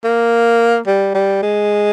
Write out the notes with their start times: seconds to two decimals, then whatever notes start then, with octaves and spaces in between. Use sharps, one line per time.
0.04 A#3
0.87 G3
1.14 G3
1.42 G#3